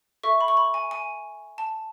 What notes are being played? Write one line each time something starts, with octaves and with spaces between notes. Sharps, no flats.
A4 E5 C#6
B5
C#6
B5
G#5
G#5
A5